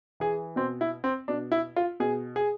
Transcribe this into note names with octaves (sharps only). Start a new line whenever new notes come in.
E3 G#4
B2 C4
E4
C4
B2 D4
E4
F4
B2 G#4
G#4